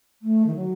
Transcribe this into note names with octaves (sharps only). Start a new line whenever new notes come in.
A3
D#3
F#3